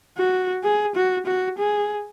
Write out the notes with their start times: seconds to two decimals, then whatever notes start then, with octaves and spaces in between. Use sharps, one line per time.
0.18 F#4
0.64 G#4
0.96 F#4
1.26 F#4
1.58 G#4